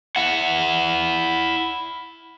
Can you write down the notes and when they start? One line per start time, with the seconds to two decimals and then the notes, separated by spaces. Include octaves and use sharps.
0.16 E4 F#5